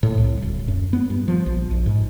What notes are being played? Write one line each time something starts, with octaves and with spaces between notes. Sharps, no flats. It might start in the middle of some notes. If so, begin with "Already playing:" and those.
A2
C2
D1
F#2
B3
G2
F3
A#1
A#1
G#2